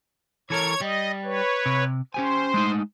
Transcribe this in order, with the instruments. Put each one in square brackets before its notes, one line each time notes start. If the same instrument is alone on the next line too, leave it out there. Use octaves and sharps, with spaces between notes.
[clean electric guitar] E3 A4 A#4 [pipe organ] C#5 G#6
[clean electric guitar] G3 [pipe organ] D#5
[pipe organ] B4 C#5
[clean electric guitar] C3
[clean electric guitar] C#4 G4 G#5 [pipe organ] C5
[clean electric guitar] G#3 A3 D#4